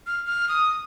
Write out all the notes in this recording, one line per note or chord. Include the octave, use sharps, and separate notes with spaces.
F6
F6
D#6